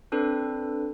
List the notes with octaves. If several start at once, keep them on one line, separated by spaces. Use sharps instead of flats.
C4 D4 A4 B4